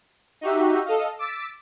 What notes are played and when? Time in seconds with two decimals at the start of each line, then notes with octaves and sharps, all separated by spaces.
0.41 D#4 F#4 G4 E5
0.85 A4 D#5 F5
1.19 D6 E6 A6 B6 D7